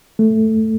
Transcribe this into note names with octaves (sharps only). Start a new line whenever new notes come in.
A3